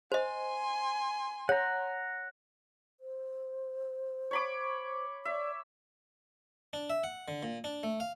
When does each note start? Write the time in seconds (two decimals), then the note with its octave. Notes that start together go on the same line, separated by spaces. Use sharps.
0.12 C5 D#5 G#5 C6
1.49 C#5 F#5 A#5
3.00 C5
4.31 C#5 B5 D6
5.25 D5 E5
6.73 D4
6.90 E5
7.04 F#5
7.28 D3
7.43 A#2
7.64 D4
7.83 A3
8.00 F5